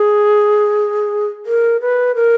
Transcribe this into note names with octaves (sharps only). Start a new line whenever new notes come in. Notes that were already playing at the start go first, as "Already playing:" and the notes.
Already playing: G#4
A#4
B4
A#4